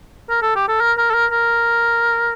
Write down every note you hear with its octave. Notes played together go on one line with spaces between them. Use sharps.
A#4
A4
G4
A4
A#4
A#4
A4
A#4
A#4